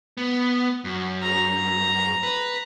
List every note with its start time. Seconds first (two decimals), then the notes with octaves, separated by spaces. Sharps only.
0.17 B3
0.84 F#2
1.23 A#5
2.23 B4